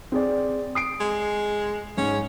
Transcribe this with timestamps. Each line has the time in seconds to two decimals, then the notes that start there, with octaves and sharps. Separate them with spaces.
0.12 C4 G#4 D5
0.75 D#6 C7 D7
1.00 G#3
1.98 G#2 C#4